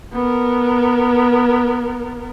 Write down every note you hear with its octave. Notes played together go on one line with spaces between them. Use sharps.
B3 A#4